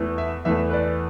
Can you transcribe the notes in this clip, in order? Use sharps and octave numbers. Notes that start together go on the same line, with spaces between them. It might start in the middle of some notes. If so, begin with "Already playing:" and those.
Already playing: E2 E3 A3
E5
E2 E3 A3 E5
B4
D5